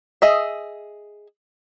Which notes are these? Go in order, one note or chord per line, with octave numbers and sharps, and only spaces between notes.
G#4 D#5 E5